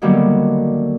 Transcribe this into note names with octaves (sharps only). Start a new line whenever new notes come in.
D3 D#3 F#3 G3 A#3 B3